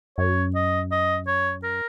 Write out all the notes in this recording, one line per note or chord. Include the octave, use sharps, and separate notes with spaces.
F#2 C#5
D#5
D#5
C#5
A#4